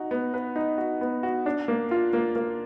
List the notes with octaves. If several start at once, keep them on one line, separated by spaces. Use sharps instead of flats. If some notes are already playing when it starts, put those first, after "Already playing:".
Already playing: D#4 F#4
B3
B4
D#4
F#4
B3
F#4
D4
A#3
F4
A#3
A#3